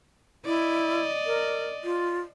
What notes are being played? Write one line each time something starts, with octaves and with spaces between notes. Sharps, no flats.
E4 D5 D#5
A#4
F4